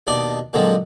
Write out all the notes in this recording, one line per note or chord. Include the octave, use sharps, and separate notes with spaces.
D#2 B2 D4 D5 D#5 D6
A#2 D3 F3 F#3 G#3 C4